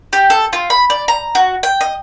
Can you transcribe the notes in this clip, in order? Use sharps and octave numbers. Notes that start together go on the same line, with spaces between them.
G4
A4
F4
B5
D5
A#5
F#4
G5
D#5